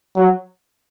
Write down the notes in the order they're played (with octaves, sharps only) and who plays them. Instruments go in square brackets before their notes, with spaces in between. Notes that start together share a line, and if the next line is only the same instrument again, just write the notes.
[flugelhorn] F#3